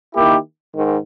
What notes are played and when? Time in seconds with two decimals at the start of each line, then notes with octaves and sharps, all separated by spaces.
0.14 D#3 A#3 E4 G4
0.75 G#2 D#3